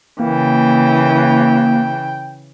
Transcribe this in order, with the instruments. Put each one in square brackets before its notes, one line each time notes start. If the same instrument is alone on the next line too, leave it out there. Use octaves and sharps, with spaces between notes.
[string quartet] C#3 E3 [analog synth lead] A#3 [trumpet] G5